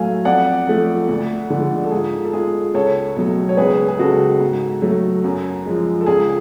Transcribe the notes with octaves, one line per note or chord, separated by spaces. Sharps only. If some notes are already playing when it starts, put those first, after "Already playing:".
Already playing: A2 F#3 A3 F5 G#5
F2 D5 F#5
F3 A3
D2
D3 F3 G#3
A4
G#2 F4 G#4
A4
G#3 F4 G#4
C#2 A4 C#5
B2 F#3 A3
C#5
C#2 G#4 B4
G#4
C#3 G#3 F#4 A4
G#2
F#3 A3
F#2
F3 G#3
A4
C#2 F4 G#4